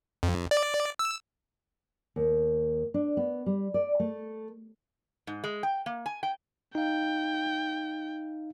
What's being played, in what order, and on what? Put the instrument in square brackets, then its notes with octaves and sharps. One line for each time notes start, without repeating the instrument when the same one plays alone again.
[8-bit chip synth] F2
D5
E6
[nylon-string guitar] D#2
D4
B3
G3
D5
A3
[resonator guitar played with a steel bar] G#2
G#3
G5
A#3
G#5
G5
[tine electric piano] D#4 F5 [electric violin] G5